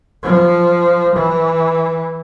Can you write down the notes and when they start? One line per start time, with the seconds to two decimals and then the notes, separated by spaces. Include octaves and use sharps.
0.23 F3
1.16 E3